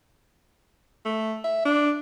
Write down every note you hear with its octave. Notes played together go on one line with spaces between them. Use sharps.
A3
E5
D4